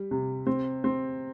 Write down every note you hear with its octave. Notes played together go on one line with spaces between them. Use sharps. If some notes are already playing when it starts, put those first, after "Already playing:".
Already playing: G3
C3
C4
C4